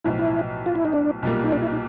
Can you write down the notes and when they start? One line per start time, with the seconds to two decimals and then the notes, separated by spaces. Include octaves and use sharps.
0.04 B1 A2 F3 E4
0.19 E4
0.66 F4
0.75 E4
0.85 D#4
0.93 D4
1.22 B1 A#2 G3 A#3
1.44 D#4
1.52 D4
1.62 E4
1.72 D#4